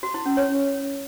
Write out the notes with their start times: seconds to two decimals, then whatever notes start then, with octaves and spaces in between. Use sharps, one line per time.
0.03 F#4
0.14 E4
0.26 C#4
0.37 C#5